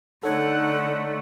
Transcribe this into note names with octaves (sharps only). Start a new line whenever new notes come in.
D3 A3 D#4 A4 C#5 F#5 G#6